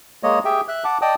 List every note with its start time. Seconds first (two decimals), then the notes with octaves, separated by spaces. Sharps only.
0.23 G#3 A#3 C#5 D#5
0.45 G4 G#4 E5 G5
0.68 E5 F#6
0.84 F#5 A5 D6
1.02 D5 D#5 G5 A5 D#6